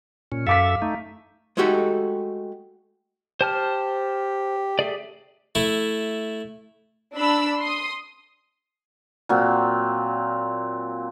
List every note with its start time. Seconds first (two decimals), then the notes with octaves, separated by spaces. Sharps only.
0.32 A#2 C#4
0.47 F#2 A4 E5 F5 D6 B6
0.82 A3 D#4
1.57 G#3 A3 D#4 F#4 G4 A4
3.41 G4 C5 A5 F6
4.79 A3 G4 G#4 D5
5.55 A3 E4
7.14 D4 B5 E6
7.60 C6 D#6
9.29 A#2 F#3 C4